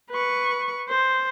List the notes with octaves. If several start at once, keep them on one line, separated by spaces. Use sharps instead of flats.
B4 C#6
C5